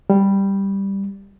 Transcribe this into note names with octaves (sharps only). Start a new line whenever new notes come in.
G3